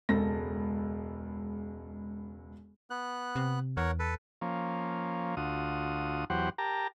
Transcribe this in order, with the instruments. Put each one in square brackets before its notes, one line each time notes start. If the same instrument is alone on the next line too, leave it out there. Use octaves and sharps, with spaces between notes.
[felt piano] E1 C#2 A4 A#6
[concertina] B3 F#6
[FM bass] C3
[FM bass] E2 [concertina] A#4 C#5 F#5
[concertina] A4 B4
[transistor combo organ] F3 A#3 C#4
D2 F4 F#4 D#6
E2 F#3 G4 C5 F#5
G4 A#4 A5 A#5